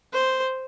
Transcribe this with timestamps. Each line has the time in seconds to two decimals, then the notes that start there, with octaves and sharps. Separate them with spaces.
0.13 C5